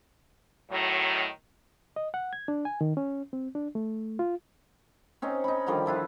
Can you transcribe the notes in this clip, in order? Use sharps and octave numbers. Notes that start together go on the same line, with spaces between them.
A2 D#3 F#3
D#5
F#5
G#6
D4
G#5
D#3
C#4
C4
D4
A3
F4
C4 C#4 D#4
D#4 B5
D3 D#3 F3 G3
F3 E4 F4 B4